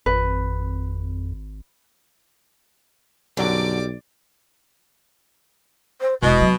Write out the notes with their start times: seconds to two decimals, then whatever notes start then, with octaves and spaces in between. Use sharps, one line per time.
0.06 G#1 F2 B4
3.37 B1 F#2 D3 F#3 G3 D5 D6
6.01 C5
6.23 E1 B2 D#5
6.41 F#3